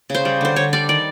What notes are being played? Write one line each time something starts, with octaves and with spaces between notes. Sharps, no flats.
C#3 C5
G3
D3 C5
D3 C#5
G3 D5
D#3 D5